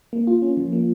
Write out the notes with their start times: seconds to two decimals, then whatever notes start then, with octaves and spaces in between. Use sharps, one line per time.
0.13 A#3
0.27 F4
0.42 C#4
0.57 F3
0.72 A#3